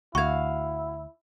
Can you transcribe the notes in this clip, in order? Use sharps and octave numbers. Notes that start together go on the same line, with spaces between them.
D2 E4 F#4 F5 C#6 G#6